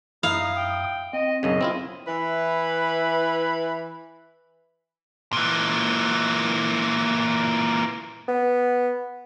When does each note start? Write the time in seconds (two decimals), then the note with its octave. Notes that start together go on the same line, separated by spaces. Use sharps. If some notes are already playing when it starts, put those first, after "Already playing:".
0.23 F#2 D#4 E4 F5 D#6
0.56 G5
1.13 C4 D#5
1.43 B1 F#2 C#3 D#5
1.61 C4 E4 F4
2.08 E3 E4 B4
5.33 A#2 E3
8.28 B3